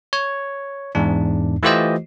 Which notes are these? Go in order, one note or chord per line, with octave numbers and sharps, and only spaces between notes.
C#5
E2 G#2 D4
E3 A3 F4 G4 C5 D#5